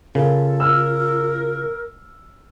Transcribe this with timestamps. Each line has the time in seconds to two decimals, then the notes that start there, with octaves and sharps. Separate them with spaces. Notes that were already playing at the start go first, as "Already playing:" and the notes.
0.15 C#3 F4 A4 A#4
0.60 A#4 E6 F6